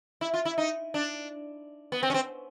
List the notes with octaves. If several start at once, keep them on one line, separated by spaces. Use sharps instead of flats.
E4
F4
E4
D#4
D4
B3
C4
C#4
C4